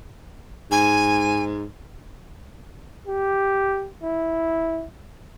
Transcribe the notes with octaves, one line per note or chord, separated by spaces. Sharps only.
G#2 G#5
G4
E4